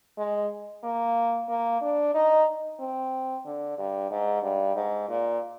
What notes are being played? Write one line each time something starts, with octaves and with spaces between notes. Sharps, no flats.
G#3
A#3
A#3
D4
D#4
C4
D3
G2
G#2
G2
G#2
A#2